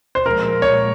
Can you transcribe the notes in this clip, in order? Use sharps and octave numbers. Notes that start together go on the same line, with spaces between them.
C5
A#2 F3 G#3 A#4
C#5